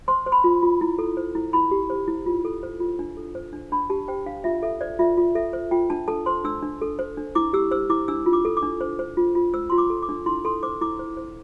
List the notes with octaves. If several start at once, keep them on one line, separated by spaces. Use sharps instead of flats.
C5 C6
C5
B5
F4
F4
E4
A4
C5
E4
E4 B5
G4
C5
E4
F4
A4
C5
F4
D4
A4
C5
D4
D4 B5
G4 A5
C5 G5
D4 F5
F4 E5
A4 E5
C5 D5
F4 E5
F4
A4 E5
C5
F4 G5
D4 A5
A4 A5
C5 C6
D4 E6
D4
A4
C5
D4
E4 D6
G4 E6
C5 E6
E4 D6
D4 E6
F4
D6
A4
D6
D4
C5
C5
F4
F4
C5 E6
F4 C6
D6
A4
D6
D4
E4 C6
A4 C6
C5 D6
E4 D6
C5
C5